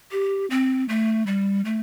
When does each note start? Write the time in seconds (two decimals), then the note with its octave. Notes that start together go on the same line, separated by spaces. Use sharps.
0.11 G4
0.50 C4
0.89 A3
1.27 G3
1.65 A3